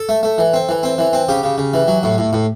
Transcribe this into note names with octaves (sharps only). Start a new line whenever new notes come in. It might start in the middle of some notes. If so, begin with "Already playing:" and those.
Already playing: A4
A3
A3
E3
C4
E3
C4
E3
C4
C#3 G4
C#3
C#3
E3
F#3
A2
A2
A2